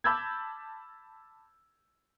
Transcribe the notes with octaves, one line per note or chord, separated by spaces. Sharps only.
A5 B5 D6 E6 G6 G#6